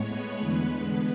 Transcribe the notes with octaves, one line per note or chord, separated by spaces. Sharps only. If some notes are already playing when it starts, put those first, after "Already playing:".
Already playing: A2 G#3 B3 C#5
B4
E2 D3 G#3 B3